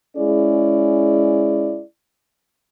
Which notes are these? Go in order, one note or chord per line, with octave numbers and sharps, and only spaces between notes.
G#3 C#4 E4 G#4 D5